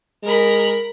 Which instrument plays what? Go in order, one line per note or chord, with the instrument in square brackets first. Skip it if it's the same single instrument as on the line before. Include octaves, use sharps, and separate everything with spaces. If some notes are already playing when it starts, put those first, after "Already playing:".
[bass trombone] G#3 [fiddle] A#4 B5